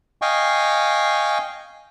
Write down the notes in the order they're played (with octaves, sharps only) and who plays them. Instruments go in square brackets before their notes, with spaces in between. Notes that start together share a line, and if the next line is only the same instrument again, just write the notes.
[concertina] D#5 F5 G5 G#5 C#6